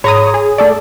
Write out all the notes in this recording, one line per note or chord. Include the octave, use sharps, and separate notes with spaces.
G#2 C#5 A#5 D#6
G#4
A3 A4 D5